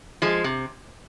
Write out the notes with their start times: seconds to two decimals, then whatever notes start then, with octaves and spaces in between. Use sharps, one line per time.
0.22 F3 G#3
0.44 C3